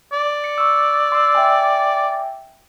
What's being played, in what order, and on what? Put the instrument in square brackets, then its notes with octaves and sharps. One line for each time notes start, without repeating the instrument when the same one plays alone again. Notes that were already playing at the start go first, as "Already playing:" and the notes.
[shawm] D5
[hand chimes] C#7
C#6 E6
C6 E6
E5 G5 G#5